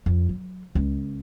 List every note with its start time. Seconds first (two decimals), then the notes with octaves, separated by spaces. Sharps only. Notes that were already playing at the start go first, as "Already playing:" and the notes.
0.06 F2
0.29 F#3
0.75 C#2